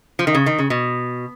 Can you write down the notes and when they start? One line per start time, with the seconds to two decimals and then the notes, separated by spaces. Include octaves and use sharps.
0.19 F3
0.27 D#3
0.34 C#3
0.46 D#3
0.58 C#3
0.70 B2